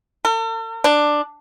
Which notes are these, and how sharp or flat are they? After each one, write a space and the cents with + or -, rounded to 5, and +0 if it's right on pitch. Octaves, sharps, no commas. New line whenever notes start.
A4 +45
D4 +10